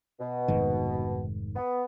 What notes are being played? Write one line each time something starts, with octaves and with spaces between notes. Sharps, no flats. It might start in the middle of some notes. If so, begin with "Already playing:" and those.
B2
F1 G#2 D#3
B3